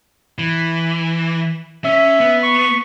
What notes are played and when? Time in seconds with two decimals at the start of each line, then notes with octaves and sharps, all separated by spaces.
0.38 E3
1.84 C#4 E5
2.20 B3
2.43 C#6